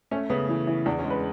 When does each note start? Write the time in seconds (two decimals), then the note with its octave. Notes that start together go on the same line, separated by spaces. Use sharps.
0.11 A3 C#4
0.30 C#3 B3
0.49 E3
0.67 E3
0.86 E2 D4
0.99 C#4
1.04 G#3
1.10 B4